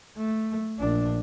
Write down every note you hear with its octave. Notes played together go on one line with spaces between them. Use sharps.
A3
A#1 D4